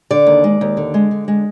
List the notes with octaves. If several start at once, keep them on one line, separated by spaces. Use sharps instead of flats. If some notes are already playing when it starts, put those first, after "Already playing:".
D3 D5
D#2
G#3
D#2
D3
G#3
D3
G#3